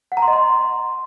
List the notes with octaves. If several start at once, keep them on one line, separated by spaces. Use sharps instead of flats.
F#5
A#5
C6
D#5
C6